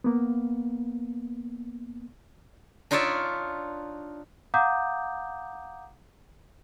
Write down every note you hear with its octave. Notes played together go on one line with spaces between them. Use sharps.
A#3 B3
D4 D#4 F4 C#5 D5 E5
F5 F#5 A#5 D6 D#6 G6